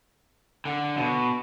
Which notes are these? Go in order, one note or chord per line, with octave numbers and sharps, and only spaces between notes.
D3
B2